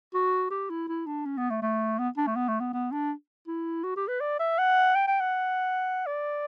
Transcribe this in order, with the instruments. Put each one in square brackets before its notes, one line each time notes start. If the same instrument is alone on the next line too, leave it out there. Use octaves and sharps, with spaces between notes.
[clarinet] F#4
G4
E4
E4
D4
C#4
B3
A3
A3
B3
D4
A3
B3
A3
B3
B3
D4
E4
F#4
G4
B4
D5
E5
F#5
G5
G5
F#5
D5